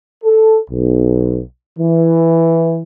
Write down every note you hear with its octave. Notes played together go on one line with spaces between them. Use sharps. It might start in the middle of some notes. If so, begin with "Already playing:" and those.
A4
B1
E3